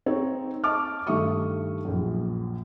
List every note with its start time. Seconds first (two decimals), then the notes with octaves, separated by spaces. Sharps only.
0.06 C4 D#4 C#5
0.64 D#5 A5 C#6 D6 F6
1.07 G2 D#3 A3 E5 C#6 D#6
1.85 A#1 F#2